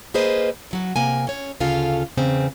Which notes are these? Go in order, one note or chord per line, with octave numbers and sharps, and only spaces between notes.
A#3 G#4 B4 C5 D#5
C#3 F#3 F#4
C3 A#3 G#5
C#4 C#5
D2 C#3 F4 A4 F5
E2 C#3 C4